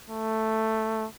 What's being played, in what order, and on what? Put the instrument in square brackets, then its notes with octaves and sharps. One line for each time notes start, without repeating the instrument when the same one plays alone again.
[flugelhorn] A3